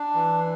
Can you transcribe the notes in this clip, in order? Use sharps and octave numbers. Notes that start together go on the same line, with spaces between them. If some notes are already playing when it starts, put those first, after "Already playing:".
Already playing: D4
E3